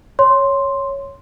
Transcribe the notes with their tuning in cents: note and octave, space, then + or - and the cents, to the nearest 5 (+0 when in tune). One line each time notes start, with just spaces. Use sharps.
C#5 +0 C6 +0